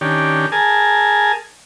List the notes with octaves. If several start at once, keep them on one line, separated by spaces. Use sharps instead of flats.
D#3 C#4 D4 G4
G#4 A#4 G#5 A5